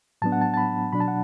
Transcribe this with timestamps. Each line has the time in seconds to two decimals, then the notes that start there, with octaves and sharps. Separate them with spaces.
0.22 A2 F#3 B3 D4 A5
0.32 F#5
0.41 A5
0.54 A5
0.57 B5
0.93 B2 F#3 D4 B5
1.00 A5
1.08 F#5